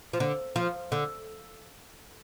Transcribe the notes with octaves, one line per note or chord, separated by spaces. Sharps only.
F3
D3
F3
D3